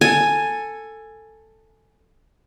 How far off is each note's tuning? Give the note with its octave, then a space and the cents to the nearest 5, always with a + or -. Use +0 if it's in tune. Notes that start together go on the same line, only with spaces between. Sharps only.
A4 +10 G#5 +0